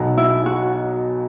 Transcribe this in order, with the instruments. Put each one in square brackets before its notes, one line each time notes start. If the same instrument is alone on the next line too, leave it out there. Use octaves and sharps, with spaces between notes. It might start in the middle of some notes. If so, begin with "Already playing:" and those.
Already playing: [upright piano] B1 B2 F#3
[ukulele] E4
F#4